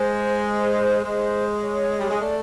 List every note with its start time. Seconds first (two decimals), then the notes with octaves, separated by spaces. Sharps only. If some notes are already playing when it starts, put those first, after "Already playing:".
Already playing: G#3 C5
1.04 G#3
1.63 C#5
2.00 G3
2.10 G#3
2.21 A3 D5